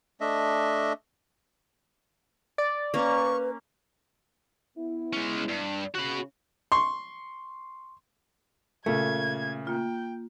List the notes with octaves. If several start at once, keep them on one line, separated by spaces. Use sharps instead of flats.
A3 D4 D#5 E5
D5
A#3 C#4 B4 C#6
B3 E4
G#3 C#4
G2
C#3 F#4 B5
C6 C#6
A#2 C#3 A3 G#6
A#3 F4 G5